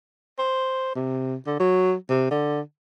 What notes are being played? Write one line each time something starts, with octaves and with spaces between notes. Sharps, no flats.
C5
C3
D3
F#3
C3
D3